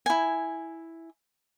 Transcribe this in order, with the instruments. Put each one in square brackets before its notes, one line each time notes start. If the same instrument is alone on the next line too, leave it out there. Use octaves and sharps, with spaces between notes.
[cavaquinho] E4 G#5